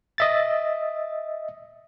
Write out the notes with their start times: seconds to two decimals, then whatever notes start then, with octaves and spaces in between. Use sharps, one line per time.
0.18 D#5 E5 A6